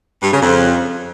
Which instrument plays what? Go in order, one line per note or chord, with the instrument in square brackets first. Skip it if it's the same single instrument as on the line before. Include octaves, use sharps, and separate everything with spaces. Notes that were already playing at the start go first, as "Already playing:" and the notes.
[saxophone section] G2
C#3
F2